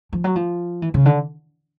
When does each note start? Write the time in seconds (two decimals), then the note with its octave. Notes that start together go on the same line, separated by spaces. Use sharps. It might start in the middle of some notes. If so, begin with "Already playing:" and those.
0.13 F3
0.24 F#3
0.36 F3
0.82 E3
0.94 C#3
1.05 D3